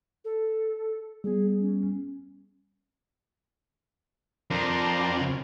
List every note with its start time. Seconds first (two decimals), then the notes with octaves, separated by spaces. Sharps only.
0.25 A4
1.24 G3 B3 G#4
1.61 C#4
4.50 F2 D4 A#4 C5
5.21 C#3